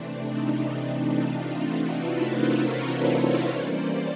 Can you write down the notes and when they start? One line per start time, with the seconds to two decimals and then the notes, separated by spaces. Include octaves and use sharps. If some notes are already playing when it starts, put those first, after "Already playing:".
Already playing: C3 E3 A3 C4 D4
0.24 D#4
0.71 D#4
1.17 D#4 F4
1.63 E4 F#4
1.94 A4 B4
2.25 A#4 C5
2.56 B4 C#5
3.49 E3 G3 A#3 C#4 C5 D5